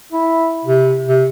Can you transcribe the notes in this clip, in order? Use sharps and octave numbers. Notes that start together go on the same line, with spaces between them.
E4
C3
C3